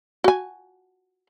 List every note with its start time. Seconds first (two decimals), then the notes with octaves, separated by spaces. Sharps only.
0.24 F#4 G#5